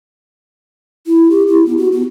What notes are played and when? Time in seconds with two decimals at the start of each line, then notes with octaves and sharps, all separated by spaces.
1.07 E4
1.30 G4
1.47 E4
1.66 B3
1.78 F#4
1.92 B3